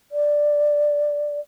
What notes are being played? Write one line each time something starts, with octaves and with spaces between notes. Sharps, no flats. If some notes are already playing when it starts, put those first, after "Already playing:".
D5